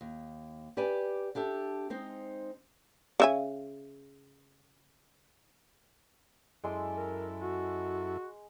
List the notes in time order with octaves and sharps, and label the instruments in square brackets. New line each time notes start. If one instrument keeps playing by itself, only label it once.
[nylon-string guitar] D#2
G4 B4 D5 G#5
D4 G4 A4 E5
G#3 C4 D#4 C5
[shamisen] C#3 E5 G#5
[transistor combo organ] F#2 E4 A4 [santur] G#3 C6 D6
[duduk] A#4
F#4